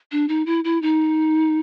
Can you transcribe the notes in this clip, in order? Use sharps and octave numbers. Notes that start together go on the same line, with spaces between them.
D4
D#4
E4
E4
D#4